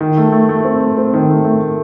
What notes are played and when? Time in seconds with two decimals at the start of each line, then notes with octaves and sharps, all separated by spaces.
0.01 D#3
0.17 A3
0.32 A3
0.49 A3
0.64 C4
0.81 A3
0.98 C4
1.14 D#3
1.29 A3
1.45 A3
1.61 A3